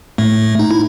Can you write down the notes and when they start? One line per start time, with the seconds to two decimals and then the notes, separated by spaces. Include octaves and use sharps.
0.18 A2 A3
0.59 D#4
0.71 E4